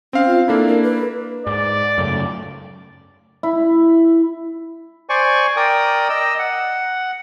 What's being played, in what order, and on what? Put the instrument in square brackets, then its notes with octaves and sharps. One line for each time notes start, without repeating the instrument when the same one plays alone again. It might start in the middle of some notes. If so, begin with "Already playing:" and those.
[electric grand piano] C4 F5 [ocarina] C#4
[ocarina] F4
[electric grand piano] A#3 D4 E4 [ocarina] A4
[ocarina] A#4
B4
[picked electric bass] G#2 [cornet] D5
[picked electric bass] F#2 C#3 A3
[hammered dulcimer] E4
[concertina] C5 D5 G#5 C#6
A#4 D5 G5 D#6
D#5 E6
F#5